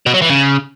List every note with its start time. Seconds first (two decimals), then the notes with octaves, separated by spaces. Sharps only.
0.06 B2
0.14 F#3
0.22 E3
0.29 C#3